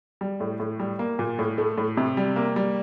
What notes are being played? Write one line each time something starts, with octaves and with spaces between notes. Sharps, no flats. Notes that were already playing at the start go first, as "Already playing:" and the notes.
G3
A2
A2
G3
A#3
A#2
A2
A3
A2
C3
G3
A#3
G3